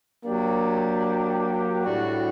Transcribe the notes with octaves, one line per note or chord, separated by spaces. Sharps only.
F#3 A#3 D4 G4
A2 G3 D4 F#4